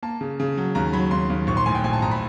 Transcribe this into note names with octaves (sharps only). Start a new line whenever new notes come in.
A#3 A5
C#3
C#3
F#3
D#2 A#5
F#3 B5
D#2 C6
D#2
A#1 C#6
C6
A2 G#5
G5
A#1 G#5
A5
A#1 A#5
B5